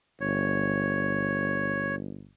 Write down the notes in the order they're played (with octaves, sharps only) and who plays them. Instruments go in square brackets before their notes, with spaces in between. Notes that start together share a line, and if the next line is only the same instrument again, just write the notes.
[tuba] G1 [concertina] C#5